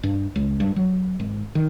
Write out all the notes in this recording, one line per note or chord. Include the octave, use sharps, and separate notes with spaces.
G2
C#2
G2
F#3
G#1
D#3